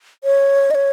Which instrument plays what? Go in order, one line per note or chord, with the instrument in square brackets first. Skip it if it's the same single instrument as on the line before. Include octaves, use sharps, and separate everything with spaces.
[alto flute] C#5
D#5
C#5